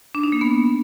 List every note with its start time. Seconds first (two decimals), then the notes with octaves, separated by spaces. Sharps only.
0.15 D4
0.23 D#4
0.32 A#3
0.41 B3